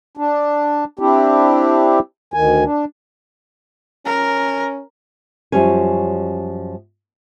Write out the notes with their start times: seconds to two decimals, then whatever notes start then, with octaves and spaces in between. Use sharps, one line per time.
0.17 D4
0.99 C4 D4 E4 G4
2.34 D2 D#3 G#5
2.65 D4
4.06 C#4 A#4
5.52 F#2 F3 G3 C#4 G#5